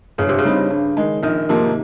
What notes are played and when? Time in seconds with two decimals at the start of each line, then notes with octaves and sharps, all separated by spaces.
0.18 G1 C#3
0.29 C3
0.39 C#3
0.44 G2 G3 C4 D#4
0.70 G2
0.97 D#3 G#3
1.23 A#1 D#3
1.49 G#2 C3 F3 A#3